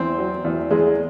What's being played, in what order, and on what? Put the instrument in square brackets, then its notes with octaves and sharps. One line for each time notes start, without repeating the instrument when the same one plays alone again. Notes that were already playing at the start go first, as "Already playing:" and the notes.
Already playing: [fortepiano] E2 C4
F#3
E2
E2 G#3